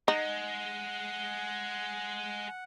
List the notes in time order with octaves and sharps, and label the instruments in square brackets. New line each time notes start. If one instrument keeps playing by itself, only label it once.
[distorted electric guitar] G#3 [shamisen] D#4 [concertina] F#5